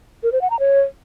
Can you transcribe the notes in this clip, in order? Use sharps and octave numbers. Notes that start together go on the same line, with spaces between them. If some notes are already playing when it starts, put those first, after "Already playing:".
A#4
C5
F#5
A#5
C#5